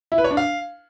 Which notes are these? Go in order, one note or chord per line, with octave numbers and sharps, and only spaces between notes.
E4
B4
C#5
D4
F5